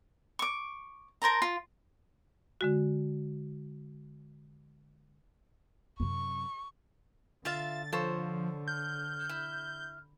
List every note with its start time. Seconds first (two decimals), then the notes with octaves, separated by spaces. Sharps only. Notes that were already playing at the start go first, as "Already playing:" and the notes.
0.39 C#6 D6
1.22 A#4 C5 A5 A#5
1.42 F4
2.61 D3 G#3 F#4
6.00 F#2 C3 C#6
7.45 D3 F4 E5 F5 A6
7.92 F3 A4 C5 C#5
8.68 F6 G6
9.29 E4